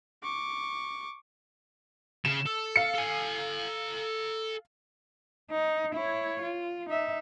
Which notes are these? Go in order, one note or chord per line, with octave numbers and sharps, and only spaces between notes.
C#6 D6
C#3 E7
A4
F5 C#7
A4 G#5
D#4
E4 C#5
F4
D#4 E5